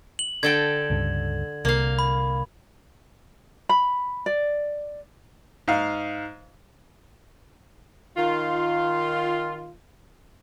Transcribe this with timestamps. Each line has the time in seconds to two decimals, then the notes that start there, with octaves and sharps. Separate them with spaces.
0.19 F#7
0.43 D3 A4 G5 G#6
0.90 C#2 G2
1.65 C2 A#3 F5
1.99 B5
3.69 B5
4.26 D5
5.68 G#2 F5
8.17 D#3 F4